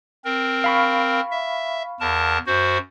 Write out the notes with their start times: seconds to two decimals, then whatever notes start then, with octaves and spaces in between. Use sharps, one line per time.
0.25 C4 A#4
0.64 F5 B5 C#6
1.31 E5
2.00 E2 A#4 A5
2.47 F#2 F#4 C5